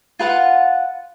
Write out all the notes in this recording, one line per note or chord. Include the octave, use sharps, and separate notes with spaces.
F4 B4 F5 F#5